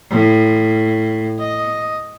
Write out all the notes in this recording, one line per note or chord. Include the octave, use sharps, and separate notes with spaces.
A2
D#5